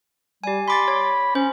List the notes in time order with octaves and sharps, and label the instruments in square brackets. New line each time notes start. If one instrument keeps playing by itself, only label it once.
[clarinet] G3 [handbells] G4 G#5
[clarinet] B5 [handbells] C6 D6 A6
[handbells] C#5
[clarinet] C#4 [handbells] C5